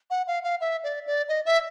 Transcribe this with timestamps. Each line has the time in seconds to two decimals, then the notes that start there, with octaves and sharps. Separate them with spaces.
0.10 F#5
0.27 F5
0.44 F5
0.61 E5
0.84 D5
1.07 D5
1.29 D#5
1.46 E5